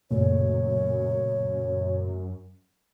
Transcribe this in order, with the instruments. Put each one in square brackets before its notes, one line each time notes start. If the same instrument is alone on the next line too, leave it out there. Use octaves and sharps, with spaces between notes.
[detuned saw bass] F#2 [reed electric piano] A#2 C#3 A3 [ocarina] C#5